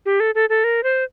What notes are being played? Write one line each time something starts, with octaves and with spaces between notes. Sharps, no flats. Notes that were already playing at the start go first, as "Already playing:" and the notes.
G4
A4
A4
A4
A#4
C5